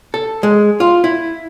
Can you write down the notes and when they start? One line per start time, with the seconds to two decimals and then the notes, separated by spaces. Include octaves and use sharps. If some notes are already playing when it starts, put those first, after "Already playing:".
0.14 A4
0.43 G#3
0.80 F4
1.04 E4